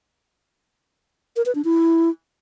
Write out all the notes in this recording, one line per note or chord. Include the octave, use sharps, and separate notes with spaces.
A#4
B4
D4
E4